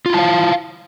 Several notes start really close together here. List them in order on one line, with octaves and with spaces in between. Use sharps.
F4 E4 A5 F5